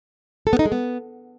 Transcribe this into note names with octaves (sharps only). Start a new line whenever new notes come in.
A4
B3
D#4
G#3
B3